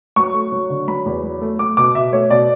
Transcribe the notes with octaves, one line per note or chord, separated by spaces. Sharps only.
F#3 C#6
A3
F#3
D3
F#3 B5
E2
F#3
A3
A3 D6
B2 D6
B2 E5
A3 C#5
B2 D5